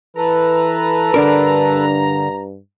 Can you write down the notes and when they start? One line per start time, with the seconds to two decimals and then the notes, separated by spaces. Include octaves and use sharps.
0.17 E3 A4 B4 A#5
1.14 G2 D3 D4 A#4